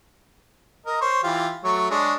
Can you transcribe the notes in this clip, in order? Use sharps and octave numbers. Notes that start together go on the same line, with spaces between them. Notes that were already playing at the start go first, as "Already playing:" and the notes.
A#4 D#5
C5 C#5
E3 F4 G4
F#3 A3 C#5
G#3 D4 C#5